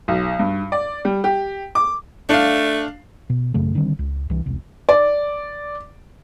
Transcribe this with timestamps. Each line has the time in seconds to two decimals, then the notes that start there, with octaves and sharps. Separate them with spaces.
0.08 B1
0.39 G2
0.72 D5
1.05 G3
1.24 G4
1.75 D6
2.29 A3 D4 F5
3.30 B2
3.54 A1 F#2 C#3 A3
3.75 D3 D#3 G3 C4
3.99 C#2
4.30 C2 E3
4.46 E1 C2
4.89 D5